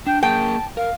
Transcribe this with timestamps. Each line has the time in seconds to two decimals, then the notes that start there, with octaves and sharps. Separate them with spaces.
0.07 D4 G5
0.23 A#3 G#4 A#4 G5 A5
0.77 A#4 F5